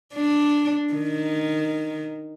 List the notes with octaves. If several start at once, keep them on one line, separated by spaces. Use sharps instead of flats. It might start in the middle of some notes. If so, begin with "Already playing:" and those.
D4
D#3